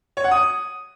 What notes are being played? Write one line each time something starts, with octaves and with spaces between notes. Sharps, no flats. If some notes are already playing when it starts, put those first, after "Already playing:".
C#5
F#5
D#6